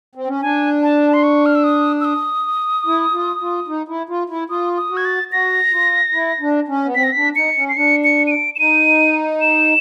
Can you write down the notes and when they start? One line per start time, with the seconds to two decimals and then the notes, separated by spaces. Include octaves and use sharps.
0.15 C4
0.28 C#4
0.41 D4 G#5
0.82 A5
1.14 C6
1.23 C#6
1.46 F6
1.55 E6
1.64 D#6
2.01 E6
2.05 D#6
2.86 E4
3.13 F4
3.41 F4
3.68 D#4
3.88 E4
4.09 F4
4.30 E4
4.50 F4 D#6
4.77 D#6
4.90 F#4
4.97 G#6
5.05 A6
5.32 F#4 A#6
5.72 F4
6.13 E4
6.41 D4
6.68 C#4
6.85 B3
6.95 C4 B6
7.04 A#6
7.12 D4 B6
7.36 D#4 C#7
7.57 C#4
7.69 C7
7.77 D4 C#7
8.04 C#7
8.27 D#7
8.31 D7
8.55 E7
8.59 D#4 D#7
9.41 E7